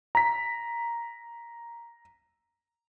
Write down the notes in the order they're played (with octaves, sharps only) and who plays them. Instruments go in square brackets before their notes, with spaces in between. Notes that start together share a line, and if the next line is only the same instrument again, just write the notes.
[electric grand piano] A#5 B6